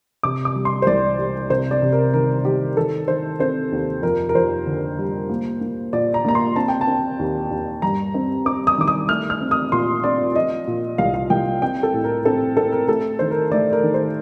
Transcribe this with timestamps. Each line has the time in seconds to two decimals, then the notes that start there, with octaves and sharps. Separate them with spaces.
0.23 C3 D6
0.45 D6
0.56 G3
0.65 C6
0.82 C5
0.87 C2 D5
1.19 G3
1.50 C3 C5
1.71 D5
1.82 C3
1.92 A#4
2.14 D#3 A#4
2.45 D#3 G4
2.77 D#3 A4
3.08 D#3 C5
3.40 C4 C5
3.72 D#2
4.03 F2 A#4
4.29 A#4
4.35 F2 C5
4.66 D3
4.98 G3
5.29 A#3
5.61 A#3
5.93 A#2 D5
6.14 A#5
6.25 A#3 A#5
6.35 C6
6.56 C4 A5
6.68 G5
6.81 A5
6.87 C4
7.19 D#2
7.51 D#2
7.82 G2 A#5
8.14 C4
8.46 C4 D6
8.67 D#6
8.78 D#3 D6
8.88 D#6
9.09 A3 F6
9.30 F6
9.41 C4
9.51 D#6
9.72 A#2 C6
10.04 C4 D5
10.35 F3 D#5
10.67 A#2
10.98 C2 F5
11.14 F5
11.30 C2 G5
11.62 C4 G5
11.83 A4
11.94 A2
12.04 A#4
12.25 C4 A4
12.57 C4 A4
12.72 A#4
12.88 A3 A4
13.19 D#3 C5
13.31 A#4
13.52 A3 D5
13.73 A#4
13.83 D#3
13.94 C5